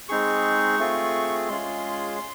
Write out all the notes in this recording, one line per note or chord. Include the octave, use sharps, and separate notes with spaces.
G#3 C4 D#4 G#4 C#6
A3 C4 F4 G#4
G#3 C#4 F4 G#4 C6